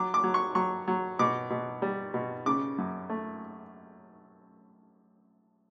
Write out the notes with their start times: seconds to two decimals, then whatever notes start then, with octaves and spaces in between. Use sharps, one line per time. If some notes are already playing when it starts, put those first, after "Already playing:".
Already playing: F#3 D6
0.14 D6
0.23 F#3
0.34 C#6
0.55 F#3 C#6
0.88 F#3
1.19 B2 D6
1.50 B2
1.82 G3
2.14 B2
2.46 C#3 D6
2.78 F#2
3.10 A3